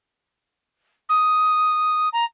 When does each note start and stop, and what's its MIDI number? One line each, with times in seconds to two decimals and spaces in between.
1.09 2.09 87
2.13 2.24 82